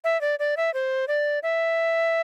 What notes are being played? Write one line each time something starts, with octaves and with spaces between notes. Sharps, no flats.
E5
D5
D5
E5
C5
D5
E5